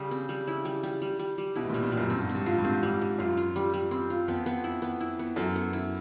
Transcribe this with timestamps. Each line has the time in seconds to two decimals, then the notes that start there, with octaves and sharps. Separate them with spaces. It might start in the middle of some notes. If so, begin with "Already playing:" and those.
Already playing: C#3 G3
0.11 C4
0.29 G3
0.47 C#3 E4
0.65 G3
0.83 G3
1.02 G3
1.19 G3
1.38 G3
1.56 B2 E4
1.64 A2
1.70 A#2
1.74 G3
1.83 A#2
1.92 G3
1.97 F#2
2.10 G2 C4
2.22 G#2
2.29 C4
2.35 G2
2.46 G#2 F4
2.58 G2
2.65 C4
2.71 G#2
2.82 G2 G3
3.01 G3
3.19 F#2 F4
3.37 F4
3.56 G3
3.74 G3
3.91 C4
4.10 F4
4.28 F2 B3
4.46 B3
4.64 E4
4.82 B3
5.00 E4
5.19 B3
5.36 F#2 A4
5.56 B3
5.73 E4